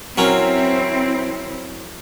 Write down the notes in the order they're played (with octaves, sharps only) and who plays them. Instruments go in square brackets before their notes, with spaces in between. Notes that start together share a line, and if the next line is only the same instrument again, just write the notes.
[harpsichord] F#3 C#4 A#4 [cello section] C4 E4